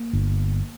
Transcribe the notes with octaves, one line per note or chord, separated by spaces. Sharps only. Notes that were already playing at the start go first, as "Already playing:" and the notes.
Already playing: A#3
G1